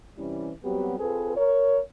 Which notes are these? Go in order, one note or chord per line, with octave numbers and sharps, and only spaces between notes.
C3 E3 G3 C#4 E4
F#3 G3 B3 C4 F#4 G4
C4 F4 G#4 A4 B4
A#4 C#5